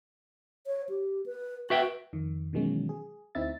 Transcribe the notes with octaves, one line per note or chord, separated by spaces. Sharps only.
C#5
G4
B4
F#4 B4 E5 G5
F2 D#3
B2 D#3 E3 F#3 G#3 C#4
G#4
D2 C4 D#4 E4 E5 A6